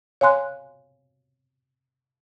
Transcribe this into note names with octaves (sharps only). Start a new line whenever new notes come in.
C#5 F5 G#5 C6 F#6